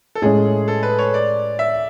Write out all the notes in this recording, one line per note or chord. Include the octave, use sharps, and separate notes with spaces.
A4
A2 G#3 C#4 G#4
A4
B4
C#5
D5
E5